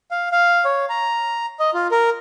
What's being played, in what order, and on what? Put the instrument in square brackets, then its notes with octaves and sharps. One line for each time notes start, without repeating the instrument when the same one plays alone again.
[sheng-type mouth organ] F5
F5
C#5
A#5
D#5
F4
A#4